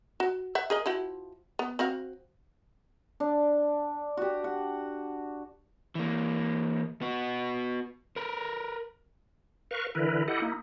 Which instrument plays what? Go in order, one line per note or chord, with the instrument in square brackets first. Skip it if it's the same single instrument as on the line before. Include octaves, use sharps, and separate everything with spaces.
[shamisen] F#4
E5 F#5
G#4 A#4 D#5
F3 E4 F#4
B3
C4 F#4 F5
[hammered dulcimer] D4
F#4 G4
F#5
[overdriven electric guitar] E3 A#3
B3 F#4
A#4 B4
[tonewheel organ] A#4 B4 F5 C#6
D3 E3 E4 A#4 B4
E4 G4 A4 D#5 F#5
A#3 D#4 E4